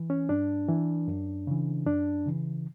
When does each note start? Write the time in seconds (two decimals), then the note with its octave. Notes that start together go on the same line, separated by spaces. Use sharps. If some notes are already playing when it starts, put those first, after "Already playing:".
Already playing: E3
0.10 C#4
0.29 G2 D4
0.69 E3
1.08 F#2
1.47 C#3 E3
1.86 F#2 D4
2.26 C#3 E3